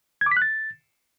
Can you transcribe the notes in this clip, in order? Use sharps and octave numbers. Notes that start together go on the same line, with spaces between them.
G#6
D6
B6
F#6
A6